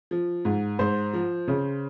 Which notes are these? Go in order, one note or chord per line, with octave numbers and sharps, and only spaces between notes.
F3
G#2
G#2 C5
F3
C#3